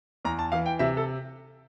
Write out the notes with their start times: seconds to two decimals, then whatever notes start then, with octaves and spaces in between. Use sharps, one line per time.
0.25 E2 A#5
0.39 A5
0.52 E3 F5
0.66 G5
0.79 C3 E5
0.97 A4